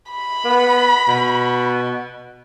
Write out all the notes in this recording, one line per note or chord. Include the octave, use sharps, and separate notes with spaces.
B5
B3
B2